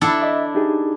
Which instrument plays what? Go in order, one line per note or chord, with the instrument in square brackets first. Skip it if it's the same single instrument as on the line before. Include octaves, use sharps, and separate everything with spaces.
[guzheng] D4 E4 A4
[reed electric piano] D#5 E5 D6
D#4 G4 G#4